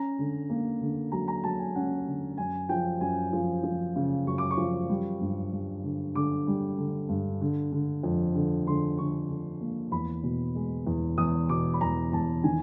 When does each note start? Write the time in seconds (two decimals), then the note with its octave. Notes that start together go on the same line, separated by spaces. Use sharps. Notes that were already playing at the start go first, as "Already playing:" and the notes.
Already playing: C#4 A#5
0.19 D3
0.50 A#3
0.81 D3
1.12 F#3 A#5
1.28 A#5
1.44 F#3 A5
1.59 G#5
1.75 C#4 F#5
2.07 D3
2.38 F#2 G#5
2.69 F3 G5
3.01 F#2 G#5
3.33 F3
3.63 F3
3.96 C#3
4.27 F#2 C#6
4.38 D6
4.51 C#6
4.57 F3
4.89 G3
5.21 G2
5.52 G3
5.83 D3
6.15 D3 D6
6.47 G3
6.78 D3
7.09 G2
7.41 D3
7.72 D3
8.03 F2
8.35 D3
8.67 D3 C6
8.98 D3 C#6
9.29 D3
9.61 A#3
9.92 E2 B5
10.23 B2
10.55 G#3
10.87 E2
11.18 E2 D#6
11.49 B2 D6
11.74 B5
11.81 E2 A#5
12.12 E2 A5
12.44 D#3 G#5